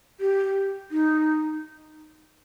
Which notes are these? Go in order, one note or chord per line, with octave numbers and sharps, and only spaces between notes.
G4
D#4